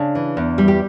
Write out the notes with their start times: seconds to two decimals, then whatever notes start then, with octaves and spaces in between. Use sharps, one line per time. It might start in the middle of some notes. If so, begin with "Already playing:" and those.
Already playing: C#3 D4
0.15 E3
0.37 E2
0.58 G3
0.68 G4